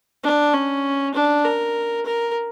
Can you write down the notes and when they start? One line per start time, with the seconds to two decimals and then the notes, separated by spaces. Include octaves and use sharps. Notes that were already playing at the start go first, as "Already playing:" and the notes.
0.24 D4
0.53 C#4
1.14 D4
1.45 A#4
2.06 A#4